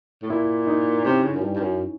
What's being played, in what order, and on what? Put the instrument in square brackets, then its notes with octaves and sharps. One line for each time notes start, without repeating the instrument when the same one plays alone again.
[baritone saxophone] A2
[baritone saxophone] A#2 [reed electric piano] E4
[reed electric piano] D#4
[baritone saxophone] C3 [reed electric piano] C#4
[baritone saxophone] C#3
F#2
G2
G2
F#2